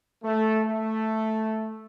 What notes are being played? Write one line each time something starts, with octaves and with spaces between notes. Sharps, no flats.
A3
A3